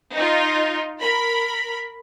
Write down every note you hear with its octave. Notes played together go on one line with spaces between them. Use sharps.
D#4 F4
A#4 B5